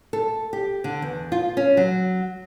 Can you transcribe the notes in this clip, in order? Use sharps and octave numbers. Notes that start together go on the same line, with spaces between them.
A4
G4
D3
E2
F4
C#4
F#3